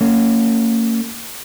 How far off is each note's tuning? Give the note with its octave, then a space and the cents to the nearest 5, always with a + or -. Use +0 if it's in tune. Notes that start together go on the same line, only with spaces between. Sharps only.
A#3 -40 C#4 +10